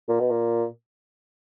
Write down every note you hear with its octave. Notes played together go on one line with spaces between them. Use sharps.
A#2
B2
A#2